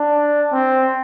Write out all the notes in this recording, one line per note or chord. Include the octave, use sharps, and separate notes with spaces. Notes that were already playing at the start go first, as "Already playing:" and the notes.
Already playing: D4
C4